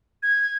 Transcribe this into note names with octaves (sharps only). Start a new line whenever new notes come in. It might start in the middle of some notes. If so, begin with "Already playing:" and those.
G#6